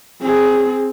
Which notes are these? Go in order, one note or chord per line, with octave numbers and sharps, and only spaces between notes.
C4 G#4